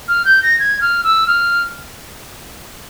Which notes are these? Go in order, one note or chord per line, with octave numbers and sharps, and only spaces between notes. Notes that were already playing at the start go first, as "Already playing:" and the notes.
F6
G6
A#6
G#6
F6
E6
F6